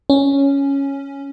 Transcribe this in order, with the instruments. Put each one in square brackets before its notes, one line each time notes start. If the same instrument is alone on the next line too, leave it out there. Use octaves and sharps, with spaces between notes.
[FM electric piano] C#4